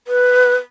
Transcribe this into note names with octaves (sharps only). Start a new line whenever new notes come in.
B4